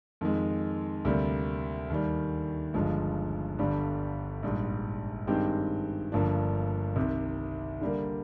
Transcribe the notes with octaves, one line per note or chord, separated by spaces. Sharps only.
F2 D#3 G#3
D2 C3 G3 A#3
D#2 D#3 G3
G1 G2 F3 G#3
G1 G2 D3 G3
A#1 G#2 G3
G2 D#3 G#3 C4 G4
G1 G2 F3 A#3 D4
C2 C3 D#3
D3 G3 A#3